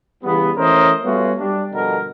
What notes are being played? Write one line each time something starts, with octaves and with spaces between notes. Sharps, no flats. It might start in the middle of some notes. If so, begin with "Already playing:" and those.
E2 C#3 G3 B3
E3 A3 C#4 A#4 C5 D#5
G3 A3 B3 C#4 F4 F#4
G3 D4
G2 B2 D3 F3 A#4